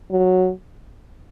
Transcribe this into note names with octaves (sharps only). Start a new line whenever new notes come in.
F#3